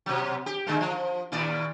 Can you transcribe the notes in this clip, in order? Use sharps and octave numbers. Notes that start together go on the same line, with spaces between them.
B2 F#3
G4
D3 G#3 A#3
F3
D#2 A#2 D5